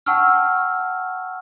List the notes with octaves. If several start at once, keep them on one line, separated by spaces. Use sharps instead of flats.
F#5 G5 A5 C#6 E6 F6